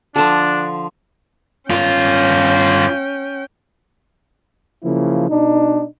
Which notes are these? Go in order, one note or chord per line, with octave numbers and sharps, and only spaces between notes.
D3 F3 D4 A4 A5
G2 C#4 F4 G5
C#3 F3 F#3 A#3 E4
B2 D4 D#4